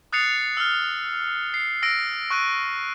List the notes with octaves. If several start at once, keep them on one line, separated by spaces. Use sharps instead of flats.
D#6 F#6 A6 C7 C#7 F7
E6 F6
C7
E6 A#6 D7
C#6 F#6 D#7